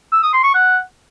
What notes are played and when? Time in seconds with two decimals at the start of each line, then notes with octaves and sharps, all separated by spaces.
0.12 E6
0.23 D#6
0.33 C6
0.44 C#6
0.54 F#5